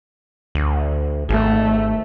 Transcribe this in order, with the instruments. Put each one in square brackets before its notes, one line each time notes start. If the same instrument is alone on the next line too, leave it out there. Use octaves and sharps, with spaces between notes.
[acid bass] D2
[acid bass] G#1 [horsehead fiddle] A3